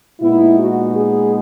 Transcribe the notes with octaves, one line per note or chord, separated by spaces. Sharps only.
A#2 G#3 B3 D#4 E4
F#4
G#4